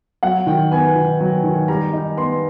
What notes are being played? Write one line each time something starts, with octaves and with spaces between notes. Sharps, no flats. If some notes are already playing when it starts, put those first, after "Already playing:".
F#3 F#5
D#3 G5
B3 G#5
D#3
F#3
D#3
G3 A#5
D#4
B3 C6